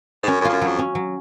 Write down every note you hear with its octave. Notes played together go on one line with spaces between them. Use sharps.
G#2
F#2 C#4
F#2
F2 F4
F#2
F2 F#3
C#4
F#3